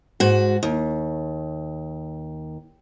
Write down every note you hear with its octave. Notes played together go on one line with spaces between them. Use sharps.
G#2 F#4
D#2